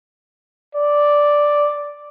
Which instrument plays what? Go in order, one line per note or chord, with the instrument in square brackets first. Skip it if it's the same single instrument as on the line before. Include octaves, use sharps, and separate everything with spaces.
[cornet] D5